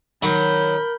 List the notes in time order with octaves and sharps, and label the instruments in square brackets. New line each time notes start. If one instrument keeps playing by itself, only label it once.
[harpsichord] D#3 F#3 [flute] A#4 [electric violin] B5 G6